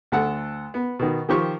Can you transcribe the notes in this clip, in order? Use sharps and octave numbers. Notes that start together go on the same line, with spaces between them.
D2 A4 F#5
B3
B2 D#3
D#3 F3 G4 C5 C#6